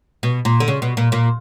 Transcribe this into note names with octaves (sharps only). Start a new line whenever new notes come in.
B2
A#2
D3
C#3
B2
A#2
A#2